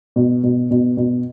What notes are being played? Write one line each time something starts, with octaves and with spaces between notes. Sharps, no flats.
B2
B2
B2
B2